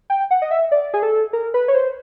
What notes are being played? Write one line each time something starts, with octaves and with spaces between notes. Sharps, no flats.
G5
F#5
D#5
E5
D5
G#4
A4
A#4
B4
C#5
C5